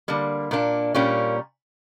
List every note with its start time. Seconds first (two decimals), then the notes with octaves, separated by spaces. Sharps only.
0.08 D3 G3 A#3
0.51 A#2 A#3 D4
0.94 A#2 G3 A#3 C#4